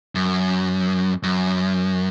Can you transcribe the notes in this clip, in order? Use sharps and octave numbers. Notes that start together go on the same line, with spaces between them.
F#2
F#2